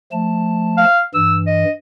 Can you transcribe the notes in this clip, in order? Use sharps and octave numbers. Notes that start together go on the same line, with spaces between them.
F3 A3 A5
F5
G2 E3 E6
D#5